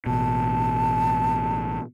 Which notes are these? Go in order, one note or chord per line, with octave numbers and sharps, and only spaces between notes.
A1 B2 A5